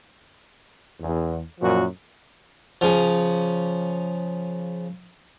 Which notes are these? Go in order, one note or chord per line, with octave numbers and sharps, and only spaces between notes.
E2
F#2 A#2 F3 F#4
C#3 F3